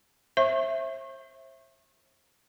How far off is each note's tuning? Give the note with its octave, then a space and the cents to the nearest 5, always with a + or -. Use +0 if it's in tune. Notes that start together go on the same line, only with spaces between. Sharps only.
C5 +45 E5 +0 C#6 -30